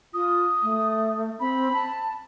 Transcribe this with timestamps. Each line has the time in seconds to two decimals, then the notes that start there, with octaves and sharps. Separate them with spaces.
0.14 F4 D#6
0.63 A3
1.40 C4 B5
1.73 A5